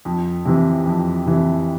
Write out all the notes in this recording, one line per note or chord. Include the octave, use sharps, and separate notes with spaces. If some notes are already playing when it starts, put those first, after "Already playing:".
F2
C3 E3
F2
C3 E3